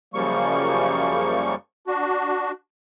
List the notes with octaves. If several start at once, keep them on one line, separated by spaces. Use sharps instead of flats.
F#2 C#3 F3 G3 A#3 C#6
D4 F#4